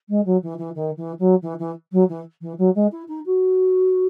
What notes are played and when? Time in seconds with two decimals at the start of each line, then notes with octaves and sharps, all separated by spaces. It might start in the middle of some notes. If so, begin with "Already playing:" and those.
0.09 G#3
0.25 F#3
0.42 E3
0.58 E3
0.75 D#3
0.97 E3
1.19 F#3
1.42 E3
1.59 E3
1.92 F#3
2.08 E3
2.41 E3
2.58 F#3
2.75 G#3
2.91 E4
3.08 D#4
3.25 F#4